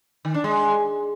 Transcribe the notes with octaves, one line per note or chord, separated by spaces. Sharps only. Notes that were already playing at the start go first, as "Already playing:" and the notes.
D#3
D4
G#3